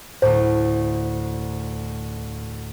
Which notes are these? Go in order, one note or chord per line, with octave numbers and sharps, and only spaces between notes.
D2 A2 C5